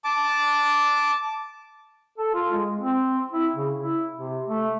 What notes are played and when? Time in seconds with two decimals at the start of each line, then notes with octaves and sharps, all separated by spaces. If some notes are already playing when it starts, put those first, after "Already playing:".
0.04 A5 D6
2.18 A4
2.34 F4
2.53 G#3
2.79 C4
3.32 E4
3.56 C#3
3.80 E4
4.16 C3
4.48 A3